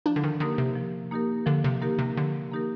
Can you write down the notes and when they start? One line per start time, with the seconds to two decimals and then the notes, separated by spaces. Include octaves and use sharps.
0.06 F3 D4
0.16 D3
0.24 D#3
0.40 D3 A#3 D#4 G4 A#4
0.58 C3
0.76 F3
1.11 A#3 D#4 G4 A#4
1.46 D3 F3
1.64 C3
1.82 A#3 D#4 G4 A#4
1.99 C3
2.16 D3 F3
2.52 A#3 D#4 G4 A#4